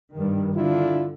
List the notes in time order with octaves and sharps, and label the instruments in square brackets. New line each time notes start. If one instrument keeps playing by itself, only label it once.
[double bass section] G2 D#3
[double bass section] D3 [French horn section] D4 E4 F4